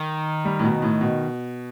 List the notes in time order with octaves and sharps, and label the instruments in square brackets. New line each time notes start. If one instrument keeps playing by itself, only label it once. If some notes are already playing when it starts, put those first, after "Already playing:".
Already playing: [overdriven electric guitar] D#3
[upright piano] G3
A2
B2
A2
B2